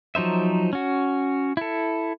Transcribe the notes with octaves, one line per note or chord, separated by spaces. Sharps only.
F3 F#3 D#4 C5 E5
C#4 F#4
E4 A4